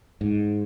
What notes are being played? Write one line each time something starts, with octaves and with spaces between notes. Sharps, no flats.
G#2